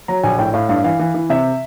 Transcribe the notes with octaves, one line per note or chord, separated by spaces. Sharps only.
F#3 A#5
A#1 G#5
A2 G5
A2 F5
G2 F5
E3 F5
E3
E3
C3 E5